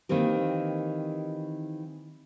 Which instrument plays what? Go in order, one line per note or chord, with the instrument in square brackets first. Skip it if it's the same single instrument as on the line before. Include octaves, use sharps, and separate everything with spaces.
[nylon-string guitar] D#3 E3 A#3 C4 G4